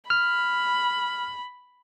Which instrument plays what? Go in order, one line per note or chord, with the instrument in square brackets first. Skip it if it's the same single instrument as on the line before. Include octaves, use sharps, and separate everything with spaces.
[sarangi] B5 [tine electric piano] F6